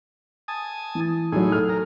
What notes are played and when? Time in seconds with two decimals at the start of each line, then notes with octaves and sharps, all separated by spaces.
0.48 G#5 A5 D#6
0.95 E3
1.32 A2 F#3 D#4 G#4
1.52 A4 F6
1.69 A#4